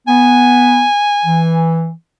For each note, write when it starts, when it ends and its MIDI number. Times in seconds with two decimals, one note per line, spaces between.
0.08 0.85 59
0.08 1.85 80
1.25 1.90 52